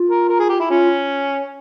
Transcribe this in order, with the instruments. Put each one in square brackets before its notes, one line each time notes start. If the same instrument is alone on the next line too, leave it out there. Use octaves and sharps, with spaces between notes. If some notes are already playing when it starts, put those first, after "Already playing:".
Already playing: [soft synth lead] F4
[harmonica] A#4
A#4
G#4
G4
E4
[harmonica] C#4 [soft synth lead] F4